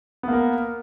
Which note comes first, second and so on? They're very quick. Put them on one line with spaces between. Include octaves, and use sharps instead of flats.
B3 A#3 A#4